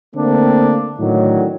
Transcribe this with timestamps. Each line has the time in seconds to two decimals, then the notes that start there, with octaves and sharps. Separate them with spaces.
0.16 D3 A3 A#3 C4 D4
0.99 A2 D3 D#3 F#3